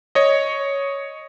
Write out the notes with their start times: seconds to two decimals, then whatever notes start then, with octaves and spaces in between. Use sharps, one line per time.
0.15 C#5 D#5